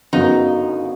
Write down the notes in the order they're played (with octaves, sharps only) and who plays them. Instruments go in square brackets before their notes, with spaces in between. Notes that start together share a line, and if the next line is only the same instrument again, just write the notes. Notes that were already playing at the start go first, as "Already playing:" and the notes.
[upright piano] G1 F#2 C#3 F#3 B3 [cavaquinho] D#4